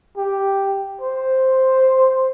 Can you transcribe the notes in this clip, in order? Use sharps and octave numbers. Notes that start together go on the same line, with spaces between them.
G4
C5